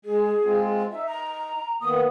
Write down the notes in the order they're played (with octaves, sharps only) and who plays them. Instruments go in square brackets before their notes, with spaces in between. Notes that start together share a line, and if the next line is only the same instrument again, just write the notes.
[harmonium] G#3 [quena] G#4
[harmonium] G#3 C4 F4
[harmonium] D#4 [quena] E5
[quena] A#5
[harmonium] D#3 A#3 B3 [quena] D#6